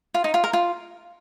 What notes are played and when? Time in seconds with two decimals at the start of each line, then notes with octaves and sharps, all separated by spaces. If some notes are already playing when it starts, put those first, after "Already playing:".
0.14 F4
0.24 D#4
0.34 F4
0.44 A#4
0.53 F4